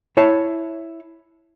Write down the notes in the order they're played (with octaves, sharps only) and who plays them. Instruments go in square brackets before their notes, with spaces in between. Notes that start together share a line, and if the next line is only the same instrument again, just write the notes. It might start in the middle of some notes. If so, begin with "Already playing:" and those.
[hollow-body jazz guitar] E4 C#5 E5 A5